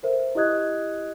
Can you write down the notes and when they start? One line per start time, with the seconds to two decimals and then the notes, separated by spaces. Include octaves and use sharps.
0.03 A4 A#4 C5 E5
0.35 E4 G4 D#5 D#6 F#6 G#6